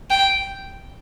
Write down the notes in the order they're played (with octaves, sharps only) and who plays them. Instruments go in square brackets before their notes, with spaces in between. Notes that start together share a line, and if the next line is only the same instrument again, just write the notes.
[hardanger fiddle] G5